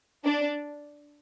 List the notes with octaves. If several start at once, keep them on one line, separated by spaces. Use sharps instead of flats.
D4